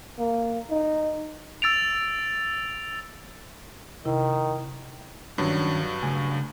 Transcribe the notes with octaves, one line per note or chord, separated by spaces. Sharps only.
A#3
D#4
E6 A6 D7 F7
C3 D#3 E4
G2 D#3 F#3 C#4 D4
C#3 A3 G#5